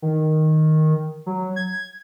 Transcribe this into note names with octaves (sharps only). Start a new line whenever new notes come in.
D#3
F#3
G#6